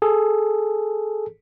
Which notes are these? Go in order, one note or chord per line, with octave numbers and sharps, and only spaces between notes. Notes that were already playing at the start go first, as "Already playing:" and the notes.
G#4 A4